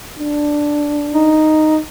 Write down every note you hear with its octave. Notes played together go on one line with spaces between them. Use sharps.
D4
D#4